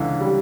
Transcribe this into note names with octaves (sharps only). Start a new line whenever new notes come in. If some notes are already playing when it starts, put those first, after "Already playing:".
Already playing: C#2 D3 E3
G3